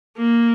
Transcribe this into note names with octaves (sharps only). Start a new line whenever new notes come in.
A#3